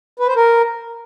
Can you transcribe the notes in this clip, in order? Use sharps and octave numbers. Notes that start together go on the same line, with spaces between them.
B4
C5
A#4